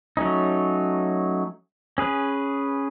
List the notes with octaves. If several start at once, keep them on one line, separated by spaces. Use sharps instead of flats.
F#3 A3 C#4 D#4
C#4 G#4 B4